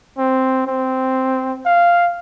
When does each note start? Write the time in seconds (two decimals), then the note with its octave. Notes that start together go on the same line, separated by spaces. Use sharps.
0.18 C4
0.67 C4
1.66 F5